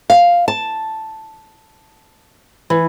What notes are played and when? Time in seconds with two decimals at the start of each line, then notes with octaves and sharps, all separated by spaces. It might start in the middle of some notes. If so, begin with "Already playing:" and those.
0.10 F5
0.48 A5
2.70 E3